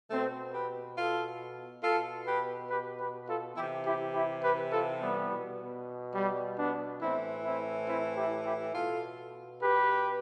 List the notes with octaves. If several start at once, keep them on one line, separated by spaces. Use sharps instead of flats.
B2 A3 C4
G4 B4
F4 A4
B2 F4 A4
G4 B4
G4 B4
G4 B4
F4 A4
C3 E3 E4 G4
E4 G4
E4 G4
G4 B4
F4 A4
G3 B3
B2
G3
B3 D4
A2 E3 C4 E4
C4 E4
C4 E4
E4 G4
E4 G4
B2 F4 A4
G4 B4